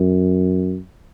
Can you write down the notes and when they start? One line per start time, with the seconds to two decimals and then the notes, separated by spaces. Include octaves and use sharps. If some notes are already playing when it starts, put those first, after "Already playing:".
Already playing: F#2